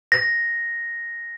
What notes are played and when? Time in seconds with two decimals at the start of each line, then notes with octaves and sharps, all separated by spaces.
0.12 A#6